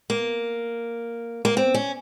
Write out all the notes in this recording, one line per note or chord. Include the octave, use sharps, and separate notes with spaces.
A#3
A#3
C4
C#4